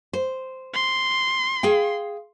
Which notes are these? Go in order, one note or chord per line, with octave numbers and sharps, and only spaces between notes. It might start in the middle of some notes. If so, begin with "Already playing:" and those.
C5
C6
G#4 F5 G5